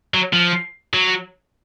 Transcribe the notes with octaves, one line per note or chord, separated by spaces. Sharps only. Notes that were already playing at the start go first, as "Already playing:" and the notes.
F#3
F3
F#3